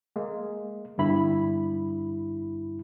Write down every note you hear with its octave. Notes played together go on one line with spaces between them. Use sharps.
G#3 A#3
G1 G2 E4 B5